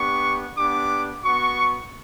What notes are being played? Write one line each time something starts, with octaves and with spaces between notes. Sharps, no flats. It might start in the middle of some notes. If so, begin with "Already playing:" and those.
Already playing: B3 D4 G4 C#6
B3 D4 G4 D6
B3 F#4 C#6